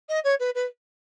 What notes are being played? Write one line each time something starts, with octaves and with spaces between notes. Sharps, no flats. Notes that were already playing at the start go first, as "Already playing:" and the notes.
D#5
C#5
B4
B4